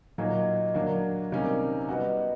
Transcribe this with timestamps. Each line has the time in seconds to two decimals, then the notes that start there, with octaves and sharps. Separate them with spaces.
0.18 A#2 F#3 A#3 D#4
0.74 F#3 A#3 D4
1.32 C3 D#3 G3 A#3 C#4
1.89 G3 B3 D#4 F#4